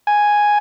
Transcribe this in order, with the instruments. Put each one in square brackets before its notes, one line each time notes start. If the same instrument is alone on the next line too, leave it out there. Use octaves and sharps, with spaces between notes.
[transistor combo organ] G#5